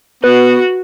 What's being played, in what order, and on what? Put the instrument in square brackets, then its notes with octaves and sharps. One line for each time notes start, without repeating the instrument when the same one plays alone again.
[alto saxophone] B3 [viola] F#4 [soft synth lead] B4